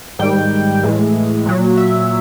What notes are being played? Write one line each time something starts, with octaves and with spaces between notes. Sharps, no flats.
G#2 D#3 G3 G5
A2 E3 G#3
A#2 F#3
E5